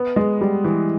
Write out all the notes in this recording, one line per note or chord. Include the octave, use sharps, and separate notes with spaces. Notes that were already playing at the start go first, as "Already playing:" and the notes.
Already playing: B3
G#3
G3
E3